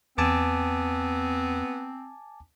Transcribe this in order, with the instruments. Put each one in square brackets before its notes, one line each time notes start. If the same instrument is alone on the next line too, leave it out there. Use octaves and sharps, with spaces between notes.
[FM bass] E2 [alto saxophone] B3 [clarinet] C4 [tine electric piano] G#5 A5 D6